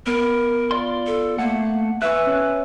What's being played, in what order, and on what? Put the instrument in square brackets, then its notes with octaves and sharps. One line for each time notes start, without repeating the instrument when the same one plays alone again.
[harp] B3 [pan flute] A#4
[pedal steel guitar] F4 D5 C6
[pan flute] A4
[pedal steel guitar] A3 F#5 [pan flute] A#3
[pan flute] B4 [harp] E5 G#5 C#6 [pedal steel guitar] F#6
[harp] C#4